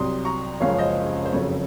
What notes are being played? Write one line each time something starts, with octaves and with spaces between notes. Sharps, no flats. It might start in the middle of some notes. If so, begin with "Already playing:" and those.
Already playing: C2 C3 F#3 C6 D#6
A#5 C#6
F#1 F#2 C#3 F3 G#3 C#5 F5
C5 D#5
C5
F#1 F2 C#3 F#3 C#5